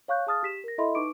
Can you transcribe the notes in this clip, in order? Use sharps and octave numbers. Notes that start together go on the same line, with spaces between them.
C#5 F5 C#6 F#6 G6
G#4 F5 A5 D#6 F6 A6
G4 B6 E7
A#4 A#6
E4 A4 D#5 E5 B5 C6
D#4 B4 C#6 D6 D7